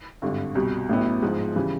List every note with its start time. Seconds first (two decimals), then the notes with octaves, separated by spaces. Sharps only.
0.22 G#1 G2 D3
0.55 C2 B2 G3
0.89 A1 A2 F#3 B3 E4
1.22 G#2 F3 G#3
1.56 C#3 E3 G3